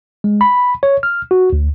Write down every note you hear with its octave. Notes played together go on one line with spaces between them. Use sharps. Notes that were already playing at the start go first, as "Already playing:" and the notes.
G#3
B5
C#5
F6
F#4
D2